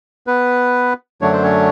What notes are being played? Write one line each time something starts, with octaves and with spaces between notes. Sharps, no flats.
B3 B4
F#2 D3 F#3 A3 D4 C#5
C5
C#4 C#5